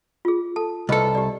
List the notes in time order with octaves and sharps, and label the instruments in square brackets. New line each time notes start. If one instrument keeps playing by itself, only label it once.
[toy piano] F4 G#4
A4 A5
[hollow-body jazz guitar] C2 A4 [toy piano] B4 D#5
[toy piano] G4 D5